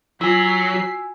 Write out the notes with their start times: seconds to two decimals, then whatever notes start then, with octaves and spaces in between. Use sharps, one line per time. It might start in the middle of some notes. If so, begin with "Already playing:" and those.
0.21 F#3 E4 F4 G#5 E6 B6 C7
0.74 F#4